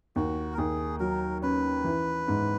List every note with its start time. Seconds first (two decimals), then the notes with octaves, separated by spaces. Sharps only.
0.16 D#2 F#4
0.53 A#4
0.58 D#2 G#4
1.00 F#3 A#4
1.42 C#4 B4
1.84 E3
2.28 G#2